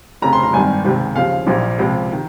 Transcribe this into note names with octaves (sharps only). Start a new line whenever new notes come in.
F1 F2 C#3 A#5
C6
A#5
G#1 G2 D#3 G#5
C#2 C3 D#3
D#2 C#3 F3 F5
A#1 A#2 F3
C#2 C3 F3
D#3